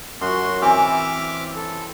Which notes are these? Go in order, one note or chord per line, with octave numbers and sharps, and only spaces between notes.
F#2 F#4 C6
E3 C4 E5 D6 F6
A4